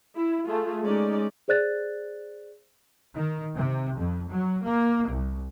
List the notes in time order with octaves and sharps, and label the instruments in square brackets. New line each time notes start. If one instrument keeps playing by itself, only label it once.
[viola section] E4
A3 F4 G#4
G#3 C#4 D#4 D5
[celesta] G#4 C5 D5 F#6 A6
[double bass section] D#3
C3
F2
F#3
A#3
C2